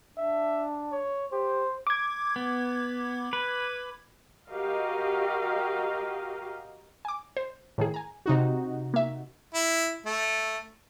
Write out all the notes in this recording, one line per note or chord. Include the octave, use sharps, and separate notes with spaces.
D4 E5
C#5
G4 C5
D6 G#6
B3
B4
F#4 G4 A#4 D#5 F5
G#5 D6
C5
A2 D#3 G#4
G#5 A#5
C3 D#4 F#4
A#3 E5
E4
A3